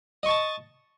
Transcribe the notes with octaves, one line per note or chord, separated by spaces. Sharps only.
D#5 A5 C#6